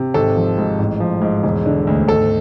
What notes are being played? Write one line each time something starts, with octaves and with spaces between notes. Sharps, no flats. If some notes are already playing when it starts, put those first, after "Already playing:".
Already playing: C3
G#1 A4
F3
G#2
A1
F3
G#2
E1
D3
D2
G#1 A4